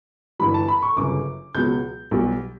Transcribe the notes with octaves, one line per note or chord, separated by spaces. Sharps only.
G1 G2 E3 G3 B5
A5
B5
C#6
G1 F#2 C#3 D6
C#2 B2 F#3 G6
B1 B2 G3